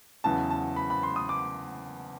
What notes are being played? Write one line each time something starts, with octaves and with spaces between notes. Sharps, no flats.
E2 C#3 F#3 B3 E4 A5
A5
B5
B5
C6
D#6
D6